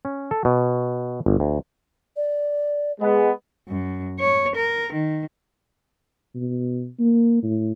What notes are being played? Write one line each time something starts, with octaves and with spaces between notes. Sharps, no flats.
C#4
A4
B2
G1
D2
D5
G#3 B3
F#2
C#5
A#4
D#3
B2
A#3
A2